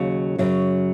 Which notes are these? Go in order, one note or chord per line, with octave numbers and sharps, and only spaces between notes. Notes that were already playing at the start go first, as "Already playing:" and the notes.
Already playing: D#2 C#3 F#3
F#2 C#3 F#3